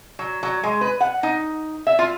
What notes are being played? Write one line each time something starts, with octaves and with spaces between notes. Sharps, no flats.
F#3
F#3
G#3
B4
F#5
D#4
E5
F4